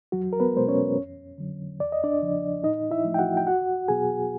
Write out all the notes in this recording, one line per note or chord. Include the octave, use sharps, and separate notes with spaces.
E2 F#3 F#4
A#4
B3 B4
B2 G#3 B3 C5
C#4 C#5
F2
D3 F#3
E2 D5
D#5
D4 D5
C#3 F3
A2 D#4 D#5
E4 E5
F3 A3
G5
F#4 F#5
G5
E2 F#4 F#5
B2 F#3 B3 G#4 G#5